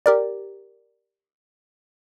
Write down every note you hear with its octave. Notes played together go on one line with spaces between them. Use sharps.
G4 A#4 D5